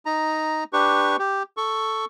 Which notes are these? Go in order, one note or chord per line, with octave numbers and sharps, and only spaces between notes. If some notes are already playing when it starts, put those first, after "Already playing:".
D#4 A#5
D4 G4 B4 C#6
G4
A4 C#6